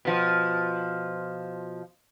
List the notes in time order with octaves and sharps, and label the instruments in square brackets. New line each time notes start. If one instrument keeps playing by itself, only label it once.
[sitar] B2 F3